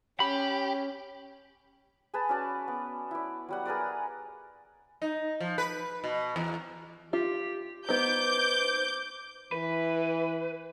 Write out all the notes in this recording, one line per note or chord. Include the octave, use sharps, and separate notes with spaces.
C#4 G4 B5
G#4 B4 A5
C#4 F#4 D5 A5
B3
E4 D5
F#3 G3 F#5
G#4 A#4 B4 D5
D#4
F3
B4
B2
E2
F4 G4
B3 D#4 C5 D6 G6
E3 B4